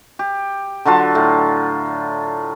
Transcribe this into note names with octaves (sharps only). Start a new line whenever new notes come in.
G4
D3 F#3 F4 A5
A2